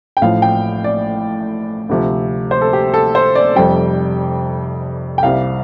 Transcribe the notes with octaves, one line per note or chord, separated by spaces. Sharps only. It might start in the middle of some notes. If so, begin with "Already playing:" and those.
G5
A1 A2 F3 F5
G5
D5
D2 C3 F3
C5
A4
G4
A4
C5
D5
F1 F2 C3 G3 G5
G5
C2 C3 G3 F5